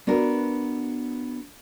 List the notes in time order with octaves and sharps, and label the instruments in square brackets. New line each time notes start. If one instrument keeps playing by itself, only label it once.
[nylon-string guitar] B3 D4 F#4 A#4